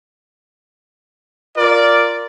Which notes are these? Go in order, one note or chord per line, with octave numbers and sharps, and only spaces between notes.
F4 A#4 D5